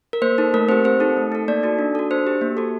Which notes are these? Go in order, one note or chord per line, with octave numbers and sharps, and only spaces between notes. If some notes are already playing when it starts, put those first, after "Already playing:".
A#4
A#3 C5
D#4 A4
A3 A#4
C4 G4 C5
C4 C5
D#4 A4
A3
D#4 A4
A#3 D5
D#4 F#4 A4
D4
F#4 A4
D4 C5
G4
A#3
F#4 A4